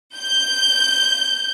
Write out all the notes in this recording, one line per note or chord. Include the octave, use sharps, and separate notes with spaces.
G6